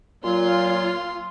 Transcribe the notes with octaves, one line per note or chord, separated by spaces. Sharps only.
A#2 F#3 F4 C6